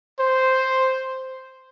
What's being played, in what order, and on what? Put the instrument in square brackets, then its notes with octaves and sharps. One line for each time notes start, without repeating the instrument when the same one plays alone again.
[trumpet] C5